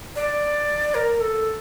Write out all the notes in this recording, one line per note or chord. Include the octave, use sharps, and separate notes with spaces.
D5
A#4
A4